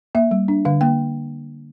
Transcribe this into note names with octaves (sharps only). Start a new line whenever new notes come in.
A#3 E5
G3
D4
D3 F5
A#3 G5